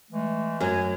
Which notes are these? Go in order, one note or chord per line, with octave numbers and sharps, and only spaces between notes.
E3 G#3 A3
F#2 F#3 G#5